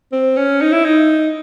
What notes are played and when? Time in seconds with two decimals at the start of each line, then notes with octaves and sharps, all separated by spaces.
0.12 C4
0.37 C#4
0.61 D#4
0.73 E4
0.85 D#4